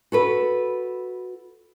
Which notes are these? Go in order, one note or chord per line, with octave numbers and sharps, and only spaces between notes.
F#4 A4 B4